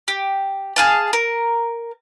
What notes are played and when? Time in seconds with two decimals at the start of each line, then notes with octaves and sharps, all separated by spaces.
0.08 G4
0.76 G#4 F5 A5
1.13 A#4